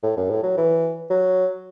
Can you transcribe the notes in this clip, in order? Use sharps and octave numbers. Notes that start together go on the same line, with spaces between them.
A2
F#2
A2
F#3
E3
F#3